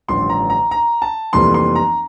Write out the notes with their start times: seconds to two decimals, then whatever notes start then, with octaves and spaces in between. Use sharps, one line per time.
0.08 A1 G2 D3 F3 C6
0.29 A#5
0.50 A#5
0.71 A#5
1.02 A5
1.33 F1 F2 E3 G3 A#3 C6
1.54 C6
1.75 A#5